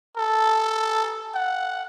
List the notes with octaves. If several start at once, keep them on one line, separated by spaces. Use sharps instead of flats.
A4
F#5